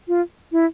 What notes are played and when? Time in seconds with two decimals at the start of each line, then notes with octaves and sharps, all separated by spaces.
0.08 F4
0.52 E4